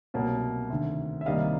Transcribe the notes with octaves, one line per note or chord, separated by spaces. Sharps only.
C2 B2 F#3 A#3
D2 C3 D#3
E5
C2 C3 D#3 G3 A#3 D#5 F5